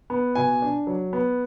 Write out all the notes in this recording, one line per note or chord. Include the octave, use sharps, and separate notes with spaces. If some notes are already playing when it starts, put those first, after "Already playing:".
B3
B2 G#5
D4
F#3
B3